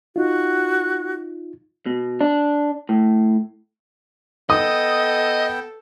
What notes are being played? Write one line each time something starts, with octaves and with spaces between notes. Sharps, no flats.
D#4 F4 F#4
B2
D4
A2
B3 A4 D#5 G5 D#6